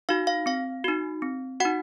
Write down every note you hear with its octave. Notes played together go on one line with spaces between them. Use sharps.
D#4 F#4 F5
F5
C4 F5
D#4 F#4
C4
D#4 F#4 F#5